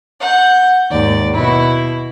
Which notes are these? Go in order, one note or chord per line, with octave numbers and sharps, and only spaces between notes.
F#5 G6
D#2 G#2 D5
B2 E4